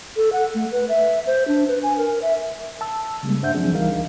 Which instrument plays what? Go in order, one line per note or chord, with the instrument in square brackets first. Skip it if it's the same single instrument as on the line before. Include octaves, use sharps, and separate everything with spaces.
[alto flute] A4
F#5
A3
B4
E5
C5
D4
B4
G#5
A#4
E5
[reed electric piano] A5 E6
C#3 G3 G#3 A#3
G2 D4 C5 E5 F#5 G6
F3 F#3 C4 D4 G#4
C#2 E3 G3 D#4 A#4 F5